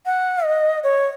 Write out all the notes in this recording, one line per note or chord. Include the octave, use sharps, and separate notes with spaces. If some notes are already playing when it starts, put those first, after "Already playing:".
F#5
D#5
C#5